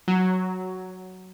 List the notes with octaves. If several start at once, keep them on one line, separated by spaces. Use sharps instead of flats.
F#3